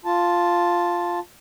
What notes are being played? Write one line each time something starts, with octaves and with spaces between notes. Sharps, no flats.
F4 A5